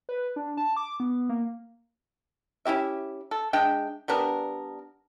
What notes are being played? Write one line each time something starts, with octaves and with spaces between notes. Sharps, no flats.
B4
D4
A5
D6
B3
A#3
C#4 E4 G4 E5
A4
G#3 D4 E5 G5
G3 B3 D4 A#4